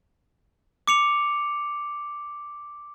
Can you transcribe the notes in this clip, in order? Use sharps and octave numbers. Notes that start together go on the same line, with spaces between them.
D6 C#7 F7